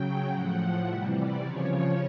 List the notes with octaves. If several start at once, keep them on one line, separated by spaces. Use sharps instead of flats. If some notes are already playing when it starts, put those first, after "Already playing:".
Already playing: C#3 F#3 G5
A2 F3 F#5
C3 E3 G3 E5
D5
C#3 F3 C#5